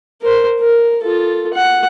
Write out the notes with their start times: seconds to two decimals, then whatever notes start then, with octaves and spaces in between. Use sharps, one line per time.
0.22 A#4 C5
0.60 A#4
1.03 F4 A4
1.53 F#5